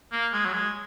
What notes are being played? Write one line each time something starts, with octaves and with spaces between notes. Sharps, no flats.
A#3
G#3
F#3
G#3